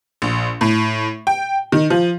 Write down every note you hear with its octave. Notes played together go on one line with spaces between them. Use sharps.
A#1
A2
G5
D#3
F3